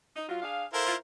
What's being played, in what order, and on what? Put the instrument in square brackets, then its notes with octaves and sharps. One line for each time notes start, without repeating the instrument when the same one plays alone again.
[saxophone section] D#4
F#3 F4
D4 G#4 F5
[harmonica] E4 A#4 C5 [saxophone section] A4 F5
[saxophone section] F4